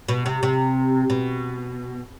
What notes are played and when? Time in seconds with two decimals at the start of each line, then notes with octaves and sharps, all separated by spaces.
0.08 B2
0.26 C3
0.43 C3
1.10 B2